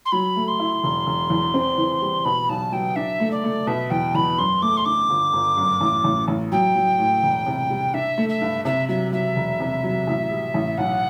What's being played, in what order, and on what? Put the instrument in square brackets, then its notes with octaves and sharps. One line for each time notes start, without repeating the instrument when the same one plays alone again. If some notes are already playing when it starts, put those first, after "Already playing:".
[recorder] C6
[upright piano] F#3 [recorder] B5
[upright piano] A3
[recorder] C6
[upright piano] E4
E1
E1
E2
C4
E3
G3
[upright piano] B2 [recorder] B5
[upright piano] B1 [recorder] A5
[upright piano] F#3 [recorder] G5
[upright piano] D4 [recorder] E5
[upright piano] A3
[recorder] D5
[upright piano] A3
[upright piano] B2 [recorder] E5
[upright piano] E2 [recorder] G5
[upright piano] E2 [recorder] B5
[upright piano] F#2 [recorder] C6
[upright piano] A3 [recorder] D6
[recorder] C6
[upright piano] D3 [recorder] D6
[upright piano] G1
G1
F#2
A1
A1
A1
[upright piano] F#3 [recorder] G5
[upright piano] F#3
A2
E1
C3
G3
[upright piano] D4 [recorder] E5
[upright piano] A3
[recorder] E5
[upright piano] G2
[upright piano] C3 [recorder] E5
[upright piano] F#3 [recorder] E5
[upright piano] F#3 [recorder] E5
[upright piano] E1
C3
F#3
A1
G3
A1
[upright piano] B1 [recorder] F#5